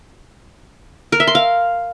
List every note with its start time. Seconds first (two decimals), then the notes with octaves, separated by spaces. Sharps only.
1.12 A#4
1.20 E5
1.27 C6
1.35 F5